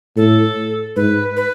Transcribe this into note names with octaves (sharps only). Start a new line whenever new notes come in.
A2 A4
G#2 B4
B4